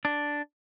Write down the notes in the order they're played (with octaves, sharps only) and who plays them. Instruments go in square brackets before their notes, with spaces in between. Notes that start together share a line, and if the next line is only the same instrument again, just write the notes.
[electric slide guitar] D4